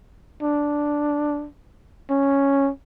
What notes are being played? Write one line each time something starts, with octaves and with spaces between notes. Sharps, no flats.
D4
C#4